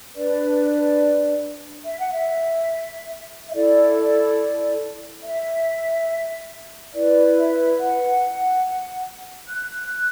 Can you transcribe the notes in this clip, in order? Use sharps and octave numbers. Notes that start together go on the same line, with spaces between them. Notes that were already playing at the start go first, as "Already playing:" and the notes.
D4 B4 D5
E5
F#5
E5
E5
E4 A4 D5
E5
E4 B4 D5
E5
F#5
F#6